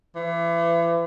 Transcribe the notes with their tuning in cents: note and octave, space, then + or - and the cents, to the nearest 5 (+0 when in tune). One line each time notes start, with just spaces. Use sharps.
E3 +35